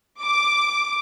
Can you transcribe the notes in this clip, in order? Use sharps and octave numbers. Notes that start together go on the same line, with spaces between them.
D6